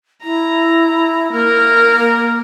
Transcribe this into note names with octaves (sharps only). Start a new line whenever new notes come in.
E4 A#5
A#3 A#4